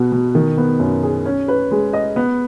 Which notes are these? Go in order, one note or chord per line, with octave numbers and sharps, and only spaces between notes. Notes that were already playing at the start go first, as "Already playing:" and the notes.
Already playing: B2 B3 F#4
B2
D#3
B3
F#2
G#4
C#4
B4
G#3
D#5
B3